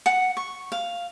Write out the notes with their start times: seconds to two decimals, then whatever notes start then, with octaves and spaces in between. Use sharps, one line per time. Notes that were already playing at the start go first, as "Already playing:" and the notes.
0.06 F#5
0.37 C#6
0.72 F5